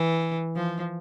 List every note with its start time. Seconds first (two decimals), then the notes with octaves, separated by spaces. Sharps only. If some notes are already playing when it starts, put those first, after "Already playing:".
Already playing: E3
0.56 F3